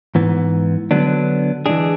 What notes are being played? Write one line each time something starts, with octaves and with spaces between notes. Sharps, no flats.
G#2 E3 B3
D3 F#3 B3 D4
E3 G#3 D4 G#4